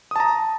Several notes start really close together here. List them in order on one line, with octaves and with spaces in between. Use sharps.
D#6 A5 A#5